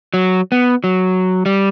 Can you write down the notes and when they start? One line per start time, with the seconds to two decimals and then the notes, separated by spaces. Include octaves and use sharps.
0.14 F#3
0.52 B3
0.84 F#3
1.46 G3